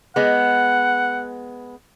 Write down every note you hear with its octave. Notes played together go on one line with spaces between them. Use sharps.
G#3 B3 F#5